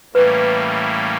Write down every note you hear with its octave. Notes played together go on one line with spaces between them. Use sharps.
A2 E3 G3 A#3 C#4 B4